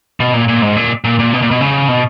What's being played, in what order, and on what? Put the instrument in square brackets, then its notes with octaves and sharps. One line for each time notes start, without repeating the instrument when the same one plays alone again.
[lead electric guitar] B2
A#2
A#2
G#2
A#2
A#2
A#2
B2
A#2
B2
C#3
B2